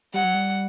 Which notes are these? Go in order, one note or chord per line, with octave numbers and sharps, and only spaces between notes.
G3 F#5
F#3
G3